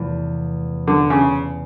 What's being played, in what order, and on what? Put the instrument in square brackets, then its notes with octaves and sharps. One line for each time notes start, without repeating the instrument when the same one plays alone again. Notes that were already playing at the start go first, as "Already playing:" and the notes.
Already playing: [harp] E2 C3 F3 A3
[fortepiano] D3
C#3